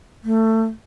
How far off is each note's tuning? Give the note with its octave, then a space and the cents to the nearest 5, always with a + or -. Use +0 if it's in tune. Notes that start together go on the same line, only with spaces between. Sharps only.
A3 +20